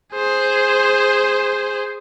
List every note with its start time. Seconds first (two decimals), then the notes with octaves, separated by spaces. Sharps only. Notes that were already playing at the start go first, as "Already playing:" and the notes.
0.14 G#4 C5